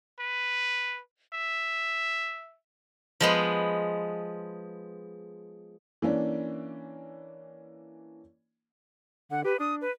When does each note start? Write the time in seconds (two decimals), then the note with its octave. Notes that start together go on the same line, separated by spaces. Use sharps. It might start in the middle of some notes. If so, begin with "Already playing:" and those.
0.20 B4
1.33 E5
3.20 F3 G#3 B3
6.02 E3 A#3 C#4 D4
9.31 D3 F#5
9.45 G4 B4
9.60 D4 D#6
9.81 B4